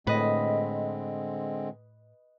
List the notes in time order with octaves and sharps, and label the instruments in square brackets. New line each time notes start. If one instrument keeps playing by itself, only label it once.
[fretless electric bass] A2 [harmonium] D3 G#3 C4 [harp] B4 D#5